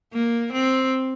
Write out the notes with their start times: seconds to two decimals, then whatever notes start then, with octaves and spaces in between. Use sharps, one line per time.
0.13 A#3
0.53 C4